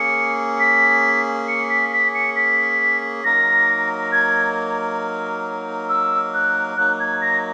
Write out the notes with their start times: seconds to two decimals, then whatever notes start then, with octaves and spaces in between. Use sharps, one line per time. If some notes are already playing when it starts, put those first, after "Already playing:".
Already playing: A#3 C#4 G#4 C#7
0.60 B6
1.48 C#7
1.70 B6
1.92 B6
2.14 C#7
2.36 B6
3.24 F#3 A#3 D#4 A#4 A#6
4.12 G#6
5.89 E6
6.34 F#6
6.77 F#3 A#3 D#4 F#6
7.00 G#6
7.21 A#6